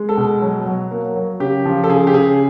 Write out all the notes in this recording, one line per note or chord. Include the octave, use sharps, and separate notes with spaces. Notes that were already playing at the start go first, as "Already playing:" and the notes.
Already playing: G#3
A4
B2
F#3
F#3
A#3
F#3
C#3 G4
F3
A4
C#3 G#4
G4
C#3 G#4